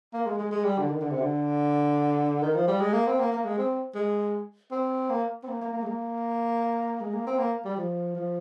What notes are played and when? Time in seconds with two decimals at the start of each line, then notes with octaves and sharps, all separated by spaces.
0.13 A#3
0.26 G#3
0.39 G#3
0.51 G#3
0.64 G3
0.78 D3
0.90 D#3
1.01 D3
1.11 C3
1.21 D3
2.42 D#3
2.55 F3
2.68 G3
2.80 G#3
2.93 A#3
3.07 C4
3.19 A#3
3.32 A#3
3.45 G#3
3.58 C4
3.95 G#3
4.71 C4
5.10 A#3
5.43 C4
5.48 A#3
5.61 A#3
5.73 A#3
5.83 G#3
5.87 A#3
7.00 G#3
7.13 A#3
7.27 C4
7.39 A#3
7.65 G3
7.77 F3
8.15 F3